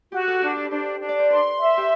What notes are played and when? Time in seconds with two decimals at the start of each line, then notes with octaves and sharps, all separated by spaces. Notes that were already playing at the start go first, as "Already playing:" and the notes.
0.12 F#4 G4
0.27 A4
0.41 D4 G4
0.56 A4
0.64 B4
0.70 D4 C5
1.00 D4
1.09 D5
1.19 C5
1.30 B4 C6
1.60 E5
1.77 G4